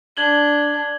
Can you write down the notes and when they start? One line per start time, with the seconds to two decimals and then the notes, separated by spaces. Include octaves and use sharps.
0.17 D4 G#6 F#7 G7